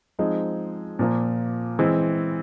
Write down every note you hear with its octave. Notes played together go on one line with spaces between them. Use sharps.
F3 G#3 C4 D#4
A#2 F3 A#3
E3 G#3 C4